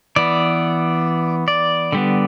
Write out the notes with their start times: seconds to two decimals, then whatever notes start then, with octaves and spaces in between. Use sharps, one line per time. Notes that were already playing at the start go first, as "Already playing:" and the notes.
0.16 E3 B3 D5
1.48 D5
1.92 D3 G3 B3